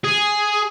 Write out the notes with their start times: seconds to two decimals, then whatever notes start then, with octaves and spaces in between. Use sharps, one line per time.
0.04 G#4